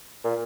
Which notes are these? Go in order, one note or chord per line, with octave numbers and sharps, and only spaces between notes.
A#2